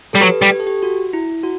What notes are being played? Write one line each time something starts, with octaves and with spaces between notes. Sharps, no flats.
G3 A4
F#3 G4 B4
G3
G4
A4
G4
F#4
E4
F#4